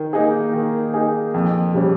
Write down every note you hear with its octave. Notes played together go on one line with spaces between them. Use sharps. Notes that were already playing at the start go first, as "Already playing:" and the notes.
Already playing: D#3
A#3 D#4 G#4
D#3
A#3 D#4 G#4
F2
C#3 G3 C#4